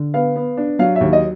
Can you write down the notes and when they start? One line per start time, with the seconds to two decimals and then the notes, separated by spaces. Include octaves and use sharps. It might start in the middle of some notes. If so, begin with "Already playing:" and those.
Already playing: D3
0.14 B3 F5
0.36 B3
0.57 D4
0.79 F#3 F5
0.96 D#2 E5
1.13 D#5